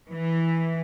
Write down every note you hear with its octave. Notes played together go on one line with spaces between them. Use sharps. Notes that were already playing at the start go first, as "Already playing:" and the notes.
E3